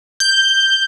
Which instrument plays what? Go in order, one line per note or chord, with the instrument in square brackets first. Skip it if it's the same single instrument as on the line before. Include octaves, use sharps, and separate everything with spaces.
[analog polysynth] G6